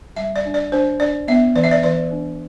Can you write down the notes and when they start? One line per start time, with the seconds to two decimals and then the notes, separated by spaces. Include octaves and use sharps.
0.16 G3 E5
0.36 D5
0.45 D4
0.54 D5
0.72 D4 C5
1.00 D4 D5
1.28 B3 E5
1.55 E3 D5
1.64 E5
1.71 D5
1.83 E3 D5
2.11 D4